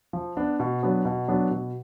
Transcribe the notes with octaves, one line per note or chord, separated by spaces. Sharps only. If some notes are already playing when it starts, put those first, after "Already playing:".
F3
B3 D4
B2
F#3 B3 D4
B2
F#3 B3 D4
B2